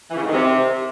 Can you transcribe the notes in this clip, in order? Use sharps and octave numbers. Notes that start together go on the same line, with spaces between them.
E3
C#3
G#2
D#3
C3